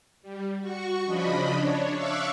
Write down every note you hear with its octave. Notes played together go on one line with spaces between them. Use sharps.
G3
F#4 C#6
C#3 F3 D4 D#5 B5
D4 C#5
E5 F5 C#6 D6 E6 F#6